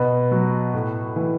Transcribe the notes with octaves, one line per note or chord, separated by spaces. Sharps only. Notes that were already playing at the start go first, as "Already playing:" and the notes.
Already playing: B2 B4
F#3
A2
E3